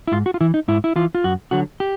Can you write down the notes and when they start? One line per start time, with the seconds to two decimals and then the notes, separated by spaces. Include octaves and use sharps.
0.07 E4
0.12 G#2 F4
0.26 F#4
0.34 F4
0.41 E3 E4
0.54 D#4
0.68 G#2 E4
0.84 E4
0.96 E3 F4
1.15 F4
1.24 F#2 F#4
1.51 D3 F#3 F#4
1.80 G4